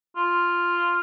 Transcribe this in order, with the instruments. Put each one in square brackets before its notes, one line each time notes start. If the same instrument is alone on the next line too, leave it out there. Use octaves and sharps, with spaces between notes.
[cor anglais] F4